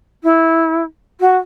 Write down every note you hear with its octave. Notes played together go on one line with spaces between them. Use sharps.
E4
F#4